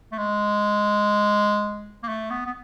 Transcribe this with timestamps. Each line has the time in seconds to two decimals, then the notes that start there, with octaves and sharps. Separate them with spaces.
0.12 A3
0.18 G#3
2.03 A#3
2.09 A3
2.30 B3
2.46 B3